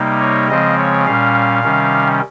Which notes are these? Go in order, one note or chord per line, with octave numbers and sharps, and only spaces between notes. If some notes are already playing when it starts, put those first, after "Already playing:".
Already playing: C3 G3 A#3 D#4
C#5
C#3 F3 G#3 C4 D#5
C#5
A#2 G3 C#4 F5
C3 D#3 G3 C#4